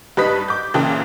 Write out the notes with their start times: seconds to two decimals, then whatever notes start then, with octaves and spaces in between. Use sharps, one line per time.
0.17 G2 G3 D#4 B4 D#6 B6
0.48 D6 G6
0.74 A#2 C#3 E3 A#3 G5 A5